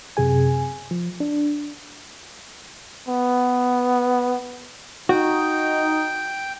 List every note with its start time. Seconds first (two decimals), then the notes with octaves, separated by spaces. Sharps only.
0.17 F#2 C3 G#4 G#5
0.91 F3
1.20 D4
3.08 B3
5.09 D#4 F#4 G5